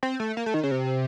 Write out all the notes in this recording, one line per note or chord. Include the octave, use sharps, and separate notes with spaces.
C4
A3
A#3
A3
D#3
C#3
C3